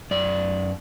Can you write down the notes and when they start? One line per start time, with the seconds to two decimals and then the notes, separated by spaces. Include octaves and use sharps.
0.11 F#2 D5